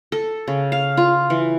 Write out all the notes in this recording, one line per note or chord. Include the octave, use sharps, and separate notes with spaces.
A4
C#3
F5
F4
E3